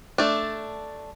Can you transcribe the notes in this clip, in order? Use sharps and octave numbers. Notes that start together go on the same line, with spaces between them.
A3 D4